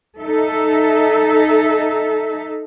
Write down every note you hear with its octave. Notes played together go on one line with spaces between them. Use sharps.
D#4 A4 E5